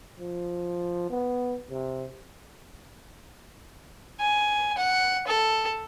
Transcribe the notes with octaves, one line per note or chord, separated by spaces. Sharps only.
F3
B3
C3
G#5
F#5
A4